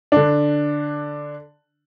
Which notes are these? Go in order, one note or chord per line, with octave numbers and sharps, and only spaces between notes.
D3 D4